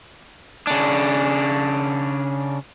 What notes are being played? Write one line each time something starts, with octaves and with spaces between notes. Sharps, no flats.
C#3 D4